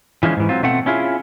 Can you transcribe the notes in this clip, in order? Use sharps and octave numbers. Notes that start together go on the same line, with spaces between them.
E3 F3 G#3 C#4
G#2 E3
F#3 C4 F4
B2 A3 C4 F#5
C#4 E4 F4 G#4